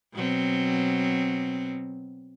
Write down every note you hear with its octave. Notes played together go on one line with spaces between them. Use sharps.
B2 F#3 C4